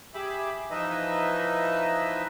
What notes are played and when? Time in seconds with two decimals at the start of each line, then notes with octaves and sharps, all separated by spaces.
0.14 G4 G#4 E5 B5 D6
0.70 E3 F3 D#4 B4 D#5 E5